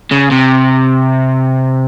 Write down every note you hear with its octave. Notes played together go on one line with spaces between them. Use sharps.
C#3
C3